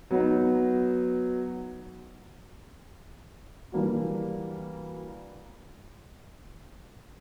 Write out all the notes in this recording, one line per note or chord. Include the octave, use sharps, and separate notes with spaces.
F#3 B3 D#4
E3 G3 A#3 D4 F#4